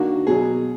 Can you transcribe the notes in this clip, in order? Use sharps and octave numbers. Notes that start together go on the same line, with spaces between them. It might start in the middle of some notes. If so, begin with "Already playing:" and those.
Already playing: D#3 A#3 D4 F#4
B2 F#3 G#4